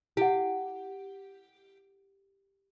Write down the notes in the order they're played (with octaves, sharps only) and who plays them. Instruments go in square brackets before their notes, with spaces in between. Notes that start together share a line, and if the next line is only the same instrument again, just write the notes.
[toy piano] E4 F#5 [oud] G4